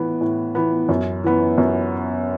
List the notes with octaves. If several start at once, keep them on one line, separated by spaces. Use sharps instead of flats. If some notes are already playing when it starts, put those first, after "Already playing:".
Already playing: A2 E3 B3
A2
E3 B3
F#2
E3 B3
F#2